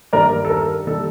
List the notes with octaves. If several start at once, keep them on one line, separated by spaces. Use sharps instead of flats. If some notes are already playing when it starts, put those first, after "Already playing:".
G2 D#3 G3 A#3 A#4 D5
A4
A#4
D#3 G3 A#3 A4